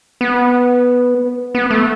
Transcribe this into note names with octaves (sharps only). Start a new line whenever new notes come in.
B3
B3
A3